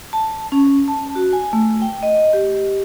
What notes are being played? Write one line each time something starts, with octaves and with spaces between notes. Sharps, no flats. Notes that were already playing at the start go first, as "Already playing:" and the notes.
A5
C#4
A5
F#4
G#5
A3
G5
D#5
G4